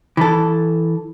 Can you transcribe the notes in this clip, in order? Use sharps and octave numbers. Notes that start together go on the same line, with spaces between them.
E3 A4